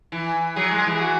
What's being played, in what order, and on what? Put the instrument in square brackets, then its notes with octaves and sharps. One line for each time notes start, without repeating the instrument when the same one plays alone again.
[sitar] E3
[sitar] F#3 [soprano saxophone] G#4
[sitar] G#3
[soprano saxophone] G#4
[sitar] E3
[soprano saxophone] G#4
F#4